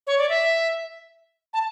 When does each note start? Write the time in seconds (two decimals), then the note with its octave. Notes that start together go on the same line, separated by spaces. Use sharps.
0.07 C#5
0.18 D5
0.29 E5
1.53 A5